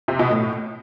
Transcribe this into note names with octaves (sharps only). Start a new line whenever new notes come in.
C3
B2
A2